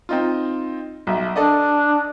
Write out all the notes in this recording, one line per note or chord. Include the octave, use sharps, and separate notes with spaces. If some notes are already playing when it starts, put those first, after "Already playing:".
C4 D#4 F4
B1 E5
D4 A4 D5 D#5